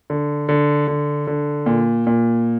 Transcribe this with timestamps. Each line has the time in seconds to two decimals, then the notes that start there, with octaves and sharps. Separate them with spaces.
0.10 D3
0.49 D3
0.88 D3
1.27 D3
1.66 A#2
2.07 A#2